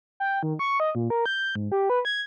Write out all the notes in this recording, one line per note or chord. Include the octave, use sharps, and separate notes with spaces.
G5
D#3
C#6
D#5
A#2
A#4
G6
G#2
G4
B4
G#6